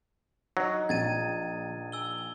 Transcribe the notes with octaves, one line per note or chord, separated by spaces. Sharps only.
F#3 D#4
A#1 G#6 A6 D#7
G#5 E6 G7